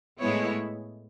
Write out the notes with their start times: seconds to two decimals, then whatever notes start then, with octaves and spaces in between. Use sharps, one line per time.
0.20 A2 G#3 B3 E4 C#5